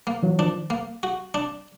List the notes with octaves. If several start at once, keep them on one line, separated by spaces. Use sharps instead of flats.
A#3
E3 F#3
D#3 F3 D4
A#3
F#4
D4